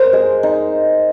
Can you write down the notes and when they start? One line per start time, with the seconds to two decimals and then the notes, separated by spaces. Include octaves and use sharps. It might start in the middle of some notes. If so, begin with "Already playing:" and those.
Already playing: A#4 C5
0.13 G#3
0.43 D#4